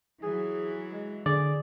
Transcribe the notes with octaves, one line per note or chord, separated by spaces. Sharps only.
E3 F#3 G#4
G#3
D3 G#4 D5